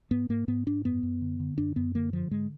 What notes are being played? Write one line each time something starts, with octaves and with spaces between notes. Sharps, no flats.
G#2 B3
G#2 A#3
G#2 B3
G#2 D4
F#2 B3
F#2
D3
D3
F#2 D4
F#2 B3
D3 A#3
D3 F3
G#2 G#3